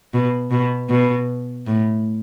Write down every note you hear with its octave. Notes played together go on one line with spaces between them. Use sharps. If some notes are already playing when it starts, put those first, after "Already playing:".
B2
B2
B2
A2